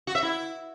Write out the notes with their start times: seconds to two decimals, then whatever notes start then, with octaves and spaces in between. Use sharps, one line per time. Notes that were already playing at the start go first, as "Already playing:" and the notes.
0.07 F#4
0.15 E5
0.23 E4